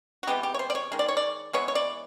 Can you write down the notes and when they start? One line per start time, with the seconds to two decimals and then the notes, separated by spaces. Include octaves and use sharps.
0.23 F#4
0.27 C3 E3 G#3 B3 G4
0.43 G4
0.54 C#5
0.59 C5
0.70 D5
0.75 C#5
0.92 D#3 G#3
0.99 D5
1.08 C#5
1.17 D5
1.53 E3 G#3 B3 C#5
1.68 C#5
1.75 D5